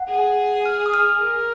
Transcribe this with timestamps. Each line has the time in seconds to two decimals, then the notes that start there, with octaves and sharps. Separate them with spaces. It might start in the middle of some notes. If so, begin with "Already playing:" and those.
Already playing: F#5
0.09 G#4
0.66 F6
0.86 D#6
0.94 F6
1.21 A#4